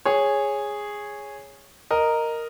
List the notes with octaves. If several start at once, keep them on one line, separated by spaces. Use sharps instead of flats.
G#4 C#5
A#4 D#5